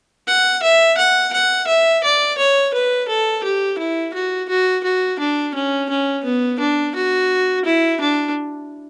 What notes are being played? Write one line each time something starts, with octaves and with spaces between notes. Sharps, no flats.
F#5
E5
F#5
F#5
E5
D5
C#5
B4
A4
G4
E4
F#4
F#4
F#4
D4
C#4
C#4
B3
D4
F#4
E4
D4